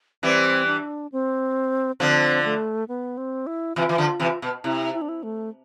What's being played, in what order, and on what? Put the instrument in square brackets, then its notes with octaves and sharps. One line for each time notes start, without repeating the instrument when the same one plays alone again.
[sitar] E3 G3 [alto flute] C4
[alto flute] D4
C4
[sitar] D3 F3 [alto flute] C4
[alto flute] A3
B3
C4
E4
[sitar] C3 E3 [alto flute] F4
[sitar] E3
D3 F3
C3 E3
B2
[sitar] C3 [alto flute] E4
[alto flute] E4
D4
E4
A3